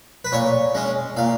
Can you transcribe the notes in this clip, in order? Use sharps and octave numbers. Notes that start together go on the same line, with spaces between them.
B4
A#2 C#5
G#3 C#4
A#2 F5